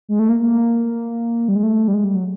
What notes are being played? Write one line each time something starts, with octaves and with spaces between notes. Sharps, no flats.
G#3
A3
A#3
A#3
G3
G#3
A3
G3
G#3
G3
F#3